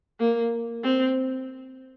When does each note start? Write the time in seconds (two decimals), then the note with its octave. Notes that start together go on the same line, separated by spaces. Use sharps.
0.20 A#3
0.84 C4